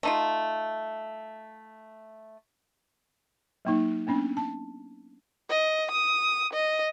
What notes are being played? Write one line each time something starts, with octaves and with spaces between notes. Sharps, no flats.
A3 D#4 F4
F#3 A#3 D#4
A#3 B3 C#4 D4
A5
D#5
D#6
D#5